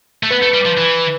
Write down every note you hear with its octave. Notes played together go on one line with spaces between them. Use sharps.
A3
B3 B4
A3
G3
F3
E3